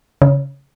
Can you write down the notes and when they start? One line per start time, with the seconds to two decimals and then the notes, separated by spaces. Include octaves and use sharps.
0.22 C#3